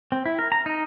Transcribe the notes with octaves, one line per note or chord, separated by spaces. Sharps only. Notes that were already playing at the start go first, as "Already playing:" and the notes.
C4
E4
A#4
A#5
D#4